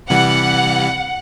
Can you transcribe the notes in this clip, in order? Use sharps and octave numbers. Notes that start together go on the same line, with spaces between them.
C3 E3 G3 F#5